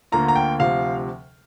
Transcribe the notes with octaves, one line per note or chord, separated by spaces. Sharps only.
D2 D3 A#3 F4 A#5
A#5
G5
D2 C3 F3 F5